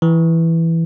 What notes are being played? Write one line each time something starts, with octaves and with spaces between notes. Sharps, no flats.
E3